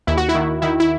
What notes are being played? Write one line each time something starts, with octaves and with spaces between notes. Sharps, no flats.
D#2 E4
F#4
E4
D#3
D#3 E4
E4